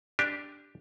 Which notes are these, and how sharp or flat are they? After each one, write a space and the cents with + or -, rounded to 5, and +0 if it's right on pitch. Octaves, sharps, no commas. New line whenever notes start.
D4 +0 G4 +0